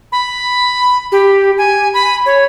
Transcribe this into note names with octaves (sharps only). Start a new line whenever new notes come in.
B5
G4
G#5
B5
C#5